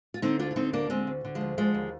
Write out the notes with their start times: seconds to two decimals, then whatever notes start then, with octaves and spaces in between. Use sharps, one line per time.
0.14 F4
0.22 D3 C4 D#4
0.39 D2 D4 F4
0.51 F4
0.56 D3 C4 D#4
0.73 D2 A#3 D4
0.90 D3 G#3 C4
1.07 D2
1.25 D3
1.35 F3 G#3
1.41 D2
1.58 D3 F3 G#3
1.74 D#2